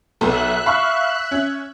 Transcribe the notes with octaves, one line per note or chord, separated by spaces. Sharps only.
B1 B3 A4 E5 F#6
F5 B5 C#6
C#4